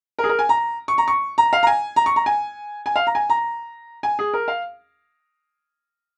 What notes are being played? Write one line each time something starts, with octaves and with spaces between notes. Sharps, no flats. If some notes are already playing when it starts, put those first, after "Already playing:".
A#4
G#4
A#4
G#5
A#5
C#6
A#5
C#6
A#5
F5
A#5
G#5
A#5
C#6
A#5
G#5
G#5
F5
A#5
G#5
A#5
G#5
G#4
A#4
F5